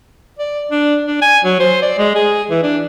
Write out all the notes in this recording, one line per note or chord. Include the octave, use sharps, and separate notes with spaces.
D5
D4
D4
G#5
F#3
C5
D5
G#3
G#4
E3
D4